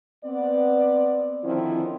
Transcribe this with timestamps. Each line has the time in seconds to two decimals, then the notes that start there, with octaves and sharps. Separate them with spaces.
0.25 B3 C4 D5
1.44 D3 D#3 F3 C4 C#4 E4